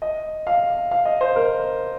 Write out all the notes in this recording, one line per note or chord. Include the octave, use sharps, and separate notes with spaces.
D#5
F5
F5
D#5
C5
A#4